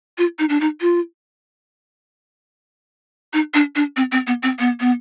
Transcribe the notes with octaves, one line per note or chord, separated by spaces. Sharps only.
F4
D#4
D4
D#4
F4
D#4
D4
D4
C4
C4
B3
C4
B3
B3